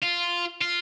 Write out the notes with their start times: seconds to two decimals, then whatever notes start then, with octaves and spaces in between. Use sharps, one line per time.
0.02 F4
0.61 F4